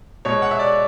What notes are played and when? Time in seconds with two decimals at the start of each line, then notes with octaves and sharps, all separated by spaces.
0.25 B2 G#3 C#5
0.42 F#5
0.51 E5
0.59 D5